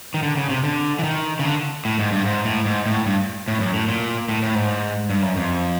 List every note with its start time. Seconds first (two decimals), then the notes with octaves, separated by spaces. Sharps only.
0.14 D#3
0.23 D3
0.37 C#3
0.50 C3
0.63 D3
0.99 E3
1.04 D#3
1.39 C#3
1.45 D3
1.85 A2
1.99 G#2
2.12 G2
2.25 G#2
2.45 A2
2.65 G#2
2.86 A2
3.06 G2
3.48 A2
3.60 F#2
3.73 A2
3.88 A#2
4.29 A2
4.42 A2
4.55 G#2
5.10 G2
5.23 F#2
5.37 F2